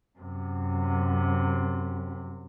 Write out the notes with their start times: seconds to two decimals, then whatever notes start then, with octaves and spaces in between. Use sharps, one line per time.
0.19 F#2 C3